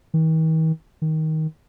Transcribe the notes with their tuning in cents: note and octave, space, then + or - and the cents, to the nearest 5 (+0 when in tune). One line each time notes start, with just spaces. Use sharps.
D#3 +45
D#3 +15